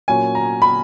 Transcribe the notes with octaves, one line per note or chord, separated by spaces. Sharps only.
A#2 F#3 C#4 G#5
A#5
B5